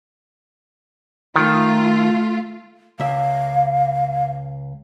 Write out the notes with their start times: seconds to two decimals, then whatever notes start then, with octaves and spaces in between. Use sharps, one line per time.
1.36 D#3 A3 F4
3.00 C#2 E5 F5